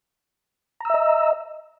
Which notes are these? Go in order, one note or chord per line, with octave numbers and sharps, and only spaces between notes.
D#5 E5 A#5 E6